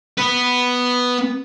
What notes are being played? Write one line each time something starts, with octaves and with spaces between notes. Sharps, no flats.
B3 B4